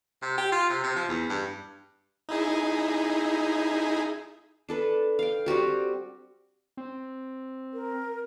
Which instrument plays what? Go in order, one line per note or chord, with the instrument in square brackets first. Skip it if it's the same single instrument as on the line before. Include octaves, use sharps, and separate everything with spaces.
[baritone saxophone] C3
G4
F4
C3
C3
F3
E2
G2
[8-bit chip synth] D#4 E4 G#4
[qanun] D4 A4 B4
F5 G5
G3 C4 F#4 G4
[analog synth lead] C4
[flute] A#4